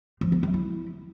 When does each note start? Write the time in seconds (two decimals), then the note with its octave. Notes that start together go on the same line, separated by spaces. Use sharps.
0.21 F3
0.32 B3
0.43 F#3
0.54 E4